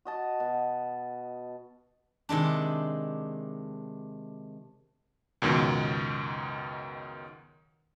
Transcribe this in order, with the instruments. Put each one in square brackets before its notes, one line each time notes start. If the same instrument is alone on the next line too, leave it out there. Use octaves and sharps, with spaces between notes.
[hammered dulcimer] F#4 D#5 A5
B2
[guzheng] C3 D#3 G#3 D4
[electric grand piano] C#2 F#2 B2 D#3